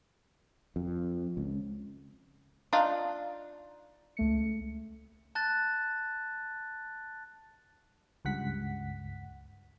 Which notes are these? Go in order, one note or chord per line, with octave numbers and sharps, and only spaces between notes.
F2
C#2
D4 D#4 F4
C#2 A3 C#7
A5 F#6 A6
C#2 G2 F#5 B6